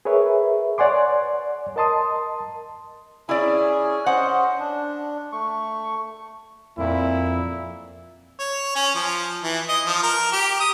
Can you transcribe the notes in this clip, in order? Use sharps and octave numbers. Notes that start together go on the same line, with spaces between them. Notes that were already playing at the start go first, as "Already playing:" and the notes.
G#4 A#4 B4 C#5 E5
C#5 D5 F#5 G#5 C6 D6
A#4 D#5 A5 C6 D#6
C#4 E4 G#4 D5 G#5
C#4 C5 D#5 F#5
D4
A3 C#6
F2 A#2 E4
C#5
C#4
F3
E3
D#5
F3
A#4
G4
D#6